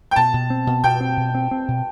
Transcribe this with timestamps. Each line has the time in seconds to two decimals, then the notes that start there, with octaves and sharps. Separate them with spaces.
0.11 G5
0.16 B2 A5
0.34 B2
0.50 C4
0.67 B2
0.83 B2 G5
1.00 C4
1.17 B2
1.35 C4
1.51 C4
1.68 B2